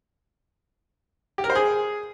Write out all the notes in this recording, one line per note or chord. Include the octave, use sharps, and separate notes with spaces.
G4
A#4
C5
G#4